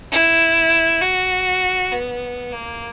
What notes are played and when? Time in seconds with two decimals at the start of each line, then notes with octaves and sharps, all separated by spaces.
0.12 E4
1.02 F#4
1.92 B3
2.52 A#3